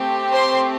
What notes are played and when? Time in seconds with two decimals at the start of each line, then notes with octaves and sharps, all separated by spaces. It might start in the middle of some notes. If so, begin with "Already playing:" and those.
Already playing: A3 C4 G4
0.31 C5 C6